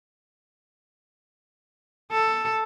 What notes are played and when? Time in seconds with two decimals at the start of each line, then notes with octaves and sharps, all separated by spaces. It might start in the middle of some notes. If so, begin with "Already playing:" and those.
2.12 A4